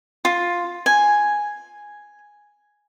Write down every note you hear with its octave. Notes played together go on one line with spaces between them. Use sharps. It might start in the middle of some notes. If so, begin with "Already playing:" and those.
F4
G#5